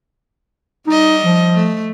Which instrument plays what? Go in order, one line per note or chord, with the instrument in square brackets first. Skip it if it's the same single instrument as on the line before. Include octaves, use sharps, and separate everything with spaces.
[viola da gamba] G3 D#5 [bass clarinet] D#4
[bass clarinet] F3
[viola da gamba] A3